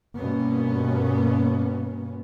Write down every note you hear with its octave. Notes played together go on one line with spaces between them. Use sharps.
G2 B2 A#3 B3 C#4